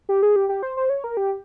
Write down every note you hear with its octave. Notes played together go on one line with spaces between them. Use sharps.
G4
G#4
G4
G4
C5
C5
C#5
A#4
G4